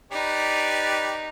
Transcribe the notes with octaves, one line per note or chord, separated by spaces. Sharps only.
D#4 G4 B4 D5